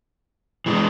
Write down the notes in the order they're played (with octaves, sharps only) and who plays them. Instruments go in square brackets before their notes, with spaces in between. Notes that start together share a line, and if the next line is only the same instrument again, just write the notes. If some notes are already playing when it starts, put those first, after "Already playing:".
[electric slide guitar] E3 G#3